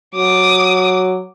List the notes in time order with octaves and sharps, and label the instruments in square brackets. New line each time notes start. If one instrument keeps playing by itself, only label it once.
[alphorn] F#3 [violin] D6 D#6